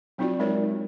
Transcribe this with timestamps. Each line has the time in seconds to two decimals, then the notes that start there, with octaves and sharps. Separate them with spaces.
0.18 F#3 C4 D#4 F4 F#4 D5
0.39 G#3 D#4 A#4 C#5 D5